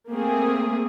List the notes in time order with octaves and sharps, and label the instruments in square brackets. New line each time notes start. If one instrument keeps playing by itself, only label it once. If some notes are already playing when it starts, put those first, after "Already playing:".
[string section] A3 A#3 C4 G#4